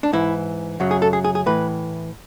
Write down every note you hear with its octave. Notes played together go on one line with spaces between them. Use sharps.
D4
G#2 E3 E4
F#2 C#3 F#3
G#4
A4
G#4
G#4
G#4
A2 E3 B4